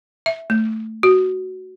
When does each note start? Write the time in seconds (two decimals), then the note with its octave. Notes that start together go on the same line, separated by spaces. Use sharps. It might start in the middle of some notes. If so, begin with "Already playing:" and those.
0.26 E5
0.50 A3
1.03 F#4